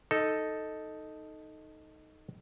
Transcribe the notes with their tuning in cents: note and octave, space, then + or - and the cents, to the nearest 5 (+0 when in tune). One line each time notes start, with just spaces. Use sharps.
D#4 +0 A4 +0